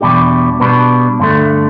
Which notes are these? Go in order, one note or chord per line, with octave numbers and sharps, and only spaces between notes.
E2 B2 G3 D4 G4
B2 G3 B3 D4
G2 D3 A3